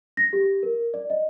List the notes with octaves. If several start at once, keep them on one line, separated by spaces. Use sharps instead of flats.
A#6
G4
A#4
D5
D#5